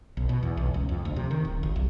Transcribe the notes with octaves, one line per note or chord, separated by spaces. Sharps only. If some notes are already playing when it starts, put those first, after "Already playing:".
B1
B2
E2
B1
C#2
F2
D2
C3
D#3
D1
G1
B1